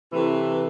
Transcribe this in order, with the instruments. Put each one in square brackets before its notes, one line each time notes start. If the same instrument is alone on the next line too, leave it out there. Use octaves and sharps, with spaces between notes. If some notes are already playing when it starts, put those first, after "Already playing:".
[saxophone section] C3 E3 A3